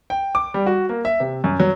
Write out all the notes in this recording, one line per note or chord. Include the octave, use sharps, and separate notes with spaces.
G5
D6
G3
F#4
A#3
E5
C3
F#2
F#3